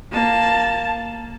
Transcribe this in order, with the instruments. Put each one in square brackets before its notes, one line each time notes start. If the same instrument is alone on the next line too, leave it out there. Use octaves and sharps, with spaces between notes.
[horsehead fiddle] A#3 A5